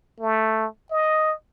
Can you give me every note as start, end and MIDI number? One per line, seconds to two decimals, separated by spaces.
0.20 0.66 57
0.91 1.33 75